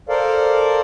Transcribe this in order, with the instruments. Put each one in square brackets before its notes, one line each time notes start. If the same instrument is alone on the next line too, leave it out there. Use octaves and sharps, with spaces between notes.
[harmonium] A4 A#4 C5 D5 F5